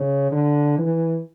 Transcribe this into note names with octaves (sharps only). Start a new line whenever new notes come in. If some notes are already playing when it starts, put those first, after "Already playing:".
Already playing: C#3
D3
E3